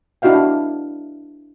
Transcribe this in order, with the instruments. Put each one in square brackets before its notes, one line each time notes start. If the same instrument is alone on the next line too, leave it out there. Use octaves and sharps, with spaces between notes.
[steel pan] D4 E4 F#4 D#5 F5 G5